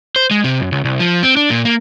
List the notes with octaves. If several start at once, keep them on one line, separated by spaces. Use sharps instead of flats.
C5
G#3
C3
F#2
C#2
C2
F3
C4
D4
A#2
A#3